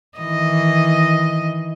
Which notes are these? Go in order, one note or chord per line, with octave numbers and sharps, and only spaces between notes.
D#3 E3 D#5